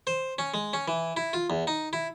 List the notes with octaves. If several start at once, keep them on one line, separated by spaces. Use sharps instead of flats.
C5
C#4
G#3
C#4
E3
E4
F4
E2
D#4
E4